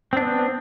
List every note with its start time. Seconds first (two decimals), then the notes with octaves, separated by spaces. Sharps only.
0.13 C4
0.17 D4
0.21 B3